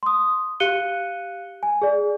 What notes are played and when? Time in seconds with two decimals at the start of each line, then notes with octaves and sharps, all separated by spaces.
0.03 C6 D#6
0.60 G4 F5 F#6 C#7 D#7 G7
1.63 G#5
1.82 G#4 D5